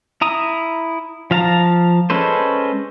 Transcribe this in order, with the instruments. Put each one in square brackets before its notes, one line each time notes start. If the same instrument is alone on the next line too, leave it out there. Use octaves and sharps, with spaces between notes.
[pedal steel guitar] E4 A#5 D#6
F3 F5 A5 A#5
G#3 C#4 A4 B4 C5